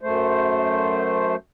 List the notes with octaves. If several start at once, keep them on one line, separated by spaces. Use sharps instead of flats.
F#2 A3 C5